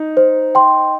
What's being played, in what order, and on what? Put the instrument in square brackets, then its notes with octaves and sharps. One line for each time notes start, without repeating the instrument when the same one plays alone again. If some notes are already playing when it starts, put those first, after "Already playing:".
Already playing: [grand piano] D#4
[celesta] C5
G5 C6